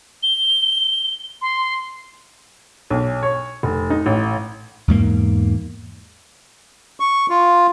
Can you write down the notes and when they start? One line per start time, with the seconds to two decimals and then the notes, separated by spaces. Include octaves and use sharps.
0.23 G7
1.42 C6
2.90 B1
3.23 C#5
3.63 F1
3.90 D#4
4.06 A1
4.88 E2 G#2 A#3
7.00 C#6
7.30 F4